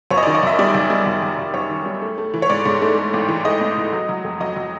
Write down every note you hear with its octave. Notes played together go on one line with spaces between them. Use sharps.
F#2 C#5
D#5
D#3 D5
D#5
F#2 E5
G3 D5
F#2
G3
F#2
F#2
F#2
F#2 C#5
D#3
G3
A3
A3
E3
C#5
G#2 D5
G#2
A3
A3
A1
E3
A3 D#5
A1
G#2
F#3
F#3
F2
F#3 D#5
F#3